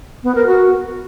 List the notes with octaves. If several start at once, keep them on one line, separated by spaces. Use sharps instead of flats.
B3
A#4
F#4